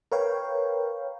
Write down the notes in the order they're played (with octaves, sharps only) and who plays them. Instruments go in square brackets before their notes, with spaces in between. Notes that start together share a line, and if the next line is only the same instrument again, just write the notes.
[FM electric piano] A#4 B4 C#5 F5 G5